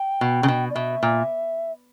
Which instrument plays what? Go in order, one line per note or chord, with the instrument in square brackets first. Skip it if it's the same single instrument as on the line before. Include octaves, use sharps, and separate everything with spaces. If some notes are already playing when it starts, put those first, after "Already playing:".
Already playing: [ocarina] G5
[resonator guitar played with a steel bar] B2
C#3
B2
[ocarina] D5
[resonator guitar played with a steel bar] B2 [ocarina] E5
[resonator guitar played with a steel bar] A#2